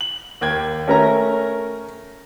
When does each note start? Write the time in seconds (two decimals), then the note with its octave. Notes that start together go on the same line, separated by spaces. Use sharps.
0.01 F#7
0.41 D#2 G5 G#6
0.88 A3 C#4 A#4 A#5